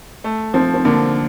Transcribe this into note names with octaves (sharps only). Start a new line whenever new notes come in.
A3
F3 C4
C4
D3 A#3